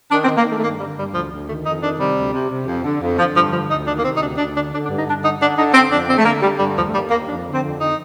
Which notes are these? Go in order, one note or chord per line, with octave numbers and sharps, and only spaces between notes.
D#3 D4
C4
D#3
A#3
D#3 A3
A3
G2 A#3
D3 G3
G2 G3
D2 F3
D2
D#3 A3
F2 D#4
D#3 D4
C3 G3
D2
C3
C3
F2
D3
F2
D3 F3
G2 F3
D3 F3
D2 D#4
D#3 D4
A#3
C3 C4
D#4
D2 D4
D2 D4
D3 D4
D3 D4
D4
G2
D#4
G2 D4
D3 D#4
D3 D4
D3 D#4
D3 C4
F2 D4
D3 C4
A3
D3 A#3
D3 G3
G2 G3
D#2 F3
A3
D#2 G3
D#2 A#3
F2 D4
D3
C4
F2
D3 D#4